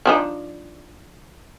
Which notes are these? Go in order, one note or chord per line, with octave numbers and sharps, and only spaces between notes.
F3 D4 D#4